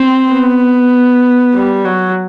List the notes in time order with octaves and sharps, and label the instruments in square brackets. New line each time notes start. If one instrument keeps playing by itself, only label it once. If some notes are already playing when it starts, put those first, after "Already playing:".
Already playing: [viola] C4
B3
G3
F#3